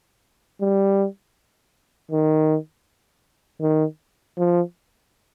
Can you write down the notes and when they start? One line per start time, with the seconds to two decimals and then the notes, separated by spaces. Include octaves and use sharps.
0.61 G3
2.11 D#3
3.62 D#3
4.38 F3